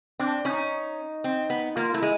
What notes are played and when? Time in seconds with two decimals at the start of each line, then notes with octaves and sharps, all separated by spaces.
0.20 C4 D4
0.45 C#4 D#4
1.24 C4
1.50 B3
1.76 A#3 F4
1.93 A3 E4
2.02 G#3